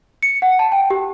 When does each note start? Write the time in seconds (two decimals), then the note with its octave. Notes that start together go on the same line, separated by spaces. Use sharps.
0.22 C#7
0.42 F#5
0.59 A5
0.72 G5
0.90 G4